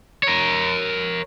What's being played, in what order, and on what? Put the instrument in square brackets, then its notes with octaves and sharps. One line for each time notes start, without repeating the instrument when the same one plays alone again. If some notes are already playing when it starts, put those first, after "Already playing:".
[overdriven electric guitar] A#4 C#5